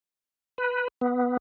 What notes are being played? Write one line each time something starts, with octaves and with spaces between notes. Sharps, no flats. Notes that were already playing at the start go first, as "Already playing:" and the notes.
B4
B3